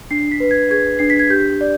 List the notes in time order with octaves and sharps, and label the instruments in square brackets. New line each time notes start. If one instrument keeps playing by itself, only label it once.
[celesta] D4 C7
B6
B4
G#6
G#4 G#6
D4 C7
B6
G#6
G4 G6
D5